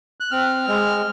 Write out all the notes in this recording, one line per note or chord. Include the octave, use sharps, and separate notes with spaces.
F#6
C4 F6
G#3